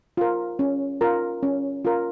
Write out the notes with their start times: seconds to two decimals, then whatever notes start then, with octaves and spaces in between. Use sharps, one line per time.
0.17 F4 A#4
0.59 C#4
1.01 F4 A#4
1.43 C#4
1.85 F4 A#4